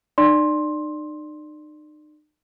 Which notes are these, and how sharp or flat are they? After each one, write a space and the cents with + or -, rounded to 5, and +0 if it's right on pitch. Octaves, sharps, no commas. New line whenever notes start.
D#4 -40 D5 +0 C6 +10